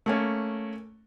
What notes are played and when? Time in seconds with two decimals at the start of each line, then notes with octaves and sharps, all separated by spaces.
0.06 A3 A#3 C#4